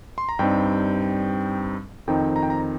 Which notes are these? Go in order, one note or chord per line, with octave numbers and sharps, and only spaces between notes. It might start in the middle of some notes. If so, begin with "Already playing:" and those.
C6
A#5
G2 G3 C4 D#4 G5
F2 D#3 C4 D#4 G5
A#5
G5
A#5